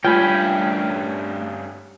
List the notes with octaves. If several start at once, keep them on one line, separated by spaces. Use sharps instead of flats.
G2 A3 C#4 F4 G5 G#5 B5